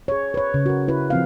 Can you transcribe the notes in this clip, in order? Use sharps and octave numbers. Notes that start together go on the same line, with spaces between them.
G#4 C#5
B4 C#5
C#3
F#4 A#4
E4 B4
F3 C4 F5